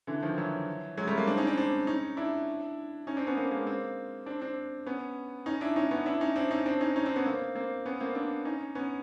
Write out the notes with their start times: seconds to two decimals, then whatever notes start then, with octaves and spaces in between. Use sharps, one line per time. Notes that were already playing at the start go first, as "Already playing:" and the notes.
0.07 D3 E3
0.22 D#3 F3
0.38 E3 F#3
0.97 F#3 G#3
1.08 G3 A3
1.17 G#3 A#3
1.27 C4 D4
1.37 C#4 D#4
1.47 C4 D4
1.57 C4 D4
1.87 C#4 D#4
2.17 D4 E4
3.07 C#4 D#4
3.17 C4 D4
3.27 B3 C#4
3.37 A#3 C4
3.52 G#3 A#3
3.67 A#3 C4
4.26 C4 D4
4.41 C4 D4
4.86 B3 C#4
5.46 C#4 D#4
5.61 D4 E4
5.76 C#4 D#4
5.91 B3 C#4
6.06 D4 E4
6.21 C#4 D#4
6.36 C4 D4
6.51 C#4 D#4
6.66 C4 D4
6.81 C#4 D#4
6.96 C#4 D#4
7.05 C4 D4
7.16 B3 C#4
7.26 A#3 C4
7.55 A#3 C4
7.86 B3 C#4
8.00 A#3 C4
8.15 C4 D4
8.45 C#4 D#4
8.75 B3 C#4